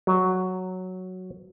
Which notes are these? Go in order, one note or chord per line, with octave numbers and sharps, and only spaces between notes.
F#3